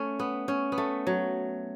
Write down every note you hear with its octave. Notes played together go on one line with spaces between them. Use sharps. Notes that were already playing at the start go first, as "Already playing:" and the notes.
Already playing: A3 C#4
B3
C#4
B3
A3
F#3